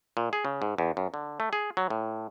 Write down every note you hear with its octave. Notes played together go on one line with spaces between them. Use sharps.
A#2
G#4
C#3
G#2
E2
F#2
D3
A3
G#4
F#3
A2